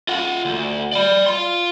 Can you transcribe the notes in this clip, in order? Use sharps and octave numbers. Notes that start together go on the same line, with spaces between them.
F4 F#5
D2
D5 B5
F4 C6